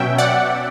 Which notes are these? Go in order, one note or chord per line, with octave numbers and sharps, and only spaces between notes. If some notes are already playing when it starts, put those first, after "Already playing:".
Already playing: B2 F#3 C#4 E5 G5
D5 F#5